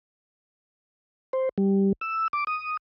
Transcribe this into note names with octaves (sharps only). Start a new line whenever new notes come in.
C5
G3
E6
D6
D#6